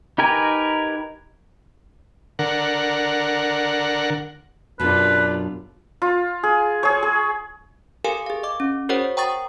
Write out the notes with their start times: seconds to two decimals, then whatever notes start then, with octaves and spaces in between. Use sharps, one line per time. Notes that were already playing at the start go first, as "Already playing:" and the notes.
0.18 D#4 G4 A#4 B4 G#5
2.39 D3 A#4 F#5
4.80 F#2 B2 D4 F4 G4 B4
6.02 F4
6.43 G#4
6.83 G#4 C#5
7.03 G#4
8.04 G4 A4 A#4 F5 G#5
8.26 G#4 F5
8.43 D#5 D6
8.60 C#4
8.89 F#4 G#4 A#4 C5 C#5 F#5
9.17 G5 A#5 C#6 D#6 A6